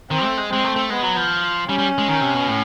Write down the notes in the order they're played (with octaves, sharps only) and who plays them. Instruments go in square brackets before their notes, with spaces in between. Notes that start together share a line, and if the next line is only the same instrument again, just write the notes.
[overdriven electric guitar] D#3 [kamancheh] C4
[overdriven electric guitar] A3
G#3
[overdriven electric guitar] G#3 [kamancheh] C4
[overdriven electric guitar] A3
A3
[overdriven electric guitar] G#3 [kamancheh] B3
[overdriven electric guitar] F#3
F3
[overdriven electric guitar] G3 [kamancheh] C#4
[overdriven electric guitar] G3
G#3
D#3
C3
B2
A2